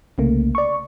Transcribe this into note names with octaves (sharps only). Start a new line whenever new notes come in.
C2 C#3 A3 A#3
D5 C#6